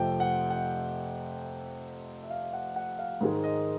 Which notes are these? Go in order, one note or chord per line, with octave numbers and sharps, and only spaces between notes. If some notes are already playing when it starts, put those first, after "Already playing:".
Already playing: F2 C3 F3 A3 G5
F#5
F#5
E5
F5
F#5
F#5
F5
G#2 D#3 G#3
D#5